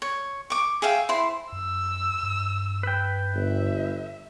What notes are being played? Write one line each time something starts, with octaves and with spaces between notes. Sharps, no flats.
C#5
C#6 D6
G#4 E5 F5 G5
E4 C5 C6
F#2 E6
G2
B4 G5
G1 E5